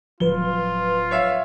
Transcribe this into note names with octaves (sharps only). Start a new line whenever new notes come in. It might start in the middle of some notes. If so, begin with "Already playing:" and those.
D1 F3 F#3 F4 B4 G7
C#5 E5 F5